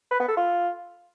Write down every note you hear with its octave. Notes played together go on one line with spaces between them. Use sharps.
B4
B3
A4
F4